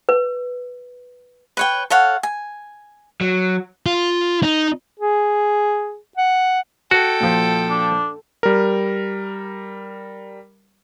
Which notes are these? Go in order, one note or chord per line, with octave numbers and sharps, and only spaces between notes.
B4
B4 C#5 G5
A4 C#5 F5 F#5
G#5
F#3
F4
D#4
G#4
F#5
F#4 A4 G5
A#2 F3
D4
G3 A#4